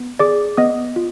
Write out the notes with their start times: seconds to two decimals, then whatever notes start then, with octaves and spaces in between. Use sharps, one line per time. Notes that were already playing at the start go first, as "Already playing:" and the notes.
Already playing: B3
0.19 G#4 D5 D6
0.57 B3 D#5 D#6
0.96 F4